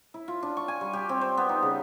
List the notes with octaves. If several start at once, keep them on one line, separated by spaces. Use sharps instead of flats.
E4
F4
D4
C#6
G#5
G3
G4
C4
C5
B3
D#4
C#3